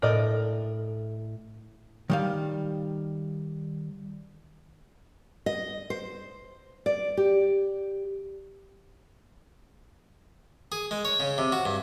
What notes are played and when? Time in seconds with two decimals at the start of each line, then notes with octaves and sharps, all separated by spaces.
0.02 A2 A#4 D5 D#5
2.10 D#3 G3 F5
5.46 D#5
5.90 C5
6.86 D5
7.17 G4
10.72 G#4
10.91 G#3
11.05 C#5
11.20 C#3
11.38 C3
11.52 F#4
11.65 G2